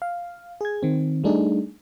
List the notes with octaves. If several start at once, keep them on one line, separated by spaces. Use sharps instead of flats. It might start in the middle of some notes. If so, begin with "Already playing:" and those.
F5
G#4 G#6
D#3 C4
G3 A3 D4 D#4 G#4